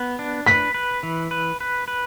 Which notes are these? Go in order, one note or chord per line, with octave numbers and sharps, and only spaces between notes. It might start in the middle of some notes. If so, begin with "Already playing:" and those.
Already playing: B3
D4
B4 B6
B4
E3
B4
B4
B4